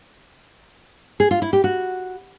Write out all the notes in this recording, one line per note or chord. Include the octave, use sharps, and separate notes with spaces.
G#4
F4
E4
G4
F#4